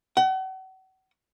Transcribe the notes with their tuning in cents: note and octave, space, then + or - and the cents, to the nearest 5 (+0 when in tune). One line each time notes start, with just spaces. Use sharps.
F#5 +40